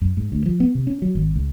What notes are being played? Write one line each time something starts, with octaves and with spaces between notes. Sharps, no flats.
F#2
G#2
D2
F3
B3
C3
C#4
F#3
G#1
C#2